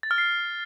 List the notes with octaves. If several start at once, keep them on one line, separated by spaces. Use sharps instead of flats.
A6
F6
C7